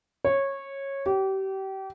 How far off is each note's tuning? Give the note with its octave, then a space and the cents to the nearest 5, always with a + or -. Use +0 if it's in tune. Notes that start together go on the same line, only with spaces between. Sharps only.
C#5 -15
G4 -30